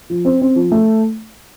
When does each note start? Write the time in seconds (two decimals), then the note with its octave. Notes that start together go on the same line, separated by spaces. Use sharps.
0.10 F3
0.25 C4
0.41 C4
0.56 F3
0.72 A3